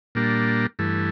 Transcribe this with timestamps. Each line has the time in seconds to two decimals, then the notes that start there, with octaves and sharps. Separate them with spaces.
0.15 A#2 G3 A#3 D4
0.79 G2 E3 A3